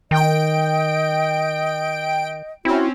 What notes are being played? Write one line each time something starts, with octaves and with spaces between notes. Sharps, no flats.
D#3 D#5 G5 D7
C4 C#4 E4 F#4